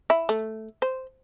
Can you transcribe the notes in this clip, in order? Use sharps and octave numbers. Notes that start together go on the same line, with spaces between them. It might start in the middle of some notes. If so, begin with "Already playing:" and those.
E4
A3
C5